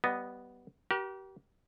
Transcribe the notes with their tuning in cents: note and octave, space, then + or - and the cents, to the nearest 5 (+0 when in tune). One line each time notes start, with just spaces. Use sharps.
G3 -25 B3 +0 D#5 +0
G4 -30 A#4 +40